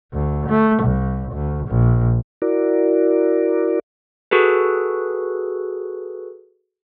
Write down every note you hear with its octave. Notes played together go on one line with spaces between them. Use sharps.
D2
A3
C2
D2
A#1
E4 F#4 A#4 D5
F#4 G#4 A4 B4